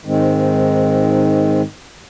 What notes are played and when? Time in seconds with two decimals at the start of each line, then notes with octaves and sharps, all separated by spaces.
0.04 G#2 D#3 G#3 C4